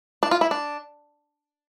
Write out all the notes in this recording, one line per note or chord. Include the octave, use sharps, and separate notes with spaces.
D4
F4
E4
D4